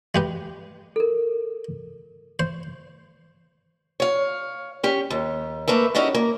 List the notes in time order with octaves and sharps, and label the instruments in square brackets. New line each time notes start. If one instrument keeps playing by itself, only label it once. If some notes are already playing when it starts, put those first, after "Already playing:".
[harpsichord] G#3 G4 B4
[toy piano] A4 A#4
[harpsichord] C5
[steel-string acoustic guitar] C#5 F5
C#4 G4
D#2
A3 A#3 B4 E5
C#4 D#4 E4 F#4 G4
A#3